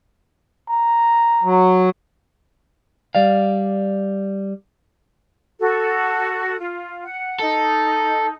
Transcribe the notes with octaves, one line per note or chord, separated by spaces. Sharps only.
A#5
F#3
G3 D5 F5
F#4 A4
F4
F#5
D#4 A4